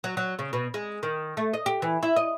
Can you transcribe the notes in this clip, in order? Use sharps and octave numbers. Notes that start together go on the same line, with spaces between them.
F#3
F#3
C#3
B2
G#3
D#3
A3
D#5
G4
E3
E4
D#5